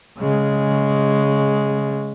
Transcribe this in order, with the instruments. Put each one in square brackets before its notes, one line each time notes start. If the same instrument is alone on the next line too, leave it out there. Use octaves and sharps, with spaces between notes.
[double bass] C#3 G#3